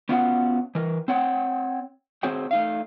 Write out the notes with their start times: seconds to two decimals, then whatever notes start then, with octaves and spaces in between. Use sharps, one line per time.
0.09 B3 C#4 F4 F#4 A#4 F#5
0.75 E3 A#4
1.08 C4 C#5 F#5 G5
2.23 C4 F#4 G#4 C5 C#5 G5
2.51 A3 D#4 F5